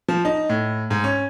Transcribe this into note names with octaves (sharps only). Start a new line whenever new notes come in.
F3
D#4
A2
G#2
C#4